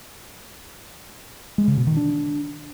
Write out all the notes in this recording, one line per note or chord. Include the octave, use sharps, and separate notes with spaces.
G#3
C#3
B2
D#3
D4